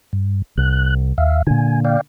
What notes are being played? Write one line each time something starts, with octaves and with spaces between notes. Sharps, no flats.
G2
C2 F#6
D#2 E5 F5
A#2 D3 G#5
D5 F5 G5